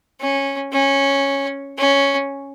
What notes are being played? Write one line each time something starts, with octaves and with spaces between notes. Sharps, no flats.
C#4
C#4
C#4